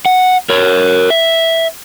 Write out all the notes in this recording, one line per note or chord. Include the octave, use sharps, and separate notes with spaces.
F#5
A#4 C#5
E5